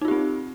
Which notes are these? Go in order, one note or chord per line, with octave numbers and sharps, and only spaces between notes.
C4 D#4 F4 G4